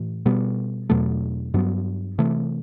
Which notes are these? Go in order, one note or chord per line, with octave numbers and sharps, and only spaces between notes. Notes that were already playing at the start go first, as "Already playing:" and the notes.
Already playing: A2 E3
B2 G3 B3
E2 B2 F#3 A3
G2 F#3 B3
C3 E3 A3